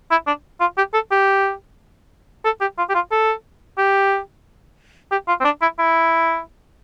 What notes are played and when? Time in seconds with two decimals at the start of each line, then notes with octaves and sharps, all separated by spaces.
0.11 E4
0.27 D4
0.60 F4
0.77 G4
0.94 A4
1.11 G4
2.45 A4
2.61 G4
2.78 F4
2.89 G4
2.95 F4
3.11 A4
3.78 G4
5.11 G4
5.28 F4
5.40 C4
5.44 D4
5.62 E4
5.79 E4